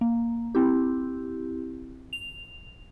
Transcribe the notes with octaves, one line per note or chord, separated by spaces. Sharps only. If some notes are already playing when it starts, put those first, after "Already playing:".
A#3
C4 E4 G4
F7